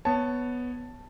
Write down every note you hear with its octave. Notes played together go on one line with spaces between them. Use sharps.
B3 C#5 A5